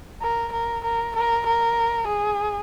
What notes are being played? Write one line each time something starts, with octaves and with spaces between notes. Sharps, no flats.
A#4
A#4
A#4
A#4
A#4
G#4